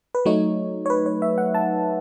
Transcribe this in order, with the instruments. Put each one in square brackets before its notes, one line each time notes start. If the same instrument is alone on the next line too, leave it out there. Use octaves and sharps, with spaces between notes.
[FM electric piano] B4
F#3 A3 D#4 C#5
C#5
B4
C#5
E5
F#5
A5